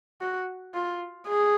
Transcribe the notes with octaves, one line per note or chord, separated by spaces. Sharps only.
F#4
F4
G#4